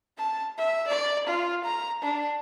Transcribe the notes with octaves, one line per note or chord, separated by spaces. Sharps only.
A5
E5
D5
F4
A#5
D4